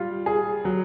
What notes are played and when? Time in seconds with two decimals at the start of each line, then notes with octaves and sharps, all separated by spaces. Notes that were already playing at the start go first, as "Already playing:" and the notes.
Already playing: G3 F4
0.26 G#4
0.65 F#3